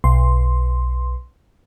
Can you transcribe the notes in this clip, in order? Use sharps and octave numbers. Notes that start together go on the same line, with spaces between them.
B1 C6